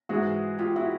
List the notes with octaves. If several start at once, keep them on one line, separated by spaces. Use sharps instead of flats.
G#2 E3 G#3 F#4 G#4
F4 G4
E4 F#4